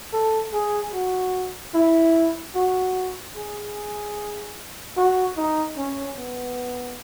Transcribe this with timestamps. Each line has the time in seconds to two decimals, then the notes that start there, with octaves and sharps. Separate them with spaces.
0.13 A4
0.53 G#4
0.94 F#4
1.75 E4
2.55 F#4
3.36 G#4
4.97 F#4
5.37 D#4
5.77 C#4
6.18 B3